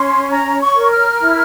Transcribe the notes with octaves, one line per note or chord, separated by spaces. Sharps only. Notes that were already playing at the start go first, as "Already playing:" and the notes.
Already playing: C#4 C6
C#5 A#5
C#6
A#4
F6
E4